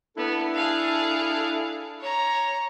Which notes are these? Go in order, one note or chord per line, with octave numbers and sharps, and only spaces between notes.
B3 D4 E4 A4
G#4 F5
C#5 A#5